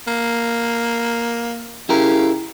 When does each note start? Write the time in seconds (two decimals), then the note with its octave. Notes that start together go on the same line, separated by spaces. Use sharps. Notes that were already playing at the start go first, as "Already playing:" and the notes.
0.07 A#3
1.89 C#3 E4 G4 A#4